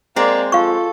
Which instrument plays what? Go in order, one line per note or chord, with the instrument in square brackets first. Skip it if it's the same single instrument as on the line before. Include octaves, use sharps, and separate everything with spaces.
[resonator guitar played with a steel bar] G#3 C4 [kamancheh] A#3 D5 [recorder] A#5
[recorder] F4 [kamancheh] A4 [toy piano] F5 C#6